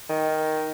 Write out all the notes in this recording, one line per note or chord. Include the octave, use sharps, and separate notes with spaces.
D#3